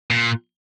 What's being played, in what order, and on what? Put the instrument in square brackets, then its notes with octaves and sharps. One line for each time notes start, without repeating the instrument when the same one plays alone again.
[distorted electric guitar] A#2